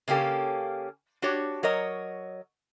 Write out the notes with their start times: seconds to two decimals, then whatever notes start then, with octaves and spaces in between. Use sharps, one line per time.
0.08 C#3 A#3 C#4 G4 A4
1.22 D4 F#4 G4 C#5
1.63 F#3 A#4 C#5 D#5